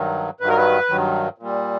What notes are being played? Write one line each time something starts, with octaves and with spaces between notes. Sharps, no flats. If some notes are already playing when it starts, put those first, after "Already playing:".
Already playing: G2 D#3 F#3
G2 D#3 F#3 B4
A#4
B4
G2 D#3 F#3
A#2 G3